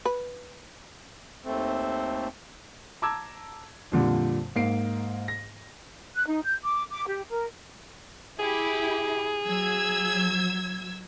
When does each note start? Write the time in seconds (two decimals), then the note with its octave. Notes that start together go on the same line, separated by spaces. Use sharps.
0.05 B4
1.45 D#2 A3 C4
3.02 A5 A#5 D6 E6 G#6
3.92 F2 A#2 D3 G3
4.55 G#2 A#3 C7 D7
5.28 A#6
6.15 F#6
6.26 D#4
6.43 G6
6.62 D6
6.90 D6
7.07 G4
7.30 A#4
8.39 E4 G4 G#4
9.44 F#3 E6 G#6